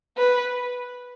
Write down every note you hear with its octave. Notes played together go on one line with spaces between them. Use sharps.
B4